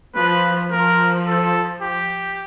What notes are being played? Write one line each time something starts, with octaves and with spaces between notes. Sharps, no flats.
F3 B4
F3 A#4
A4
G4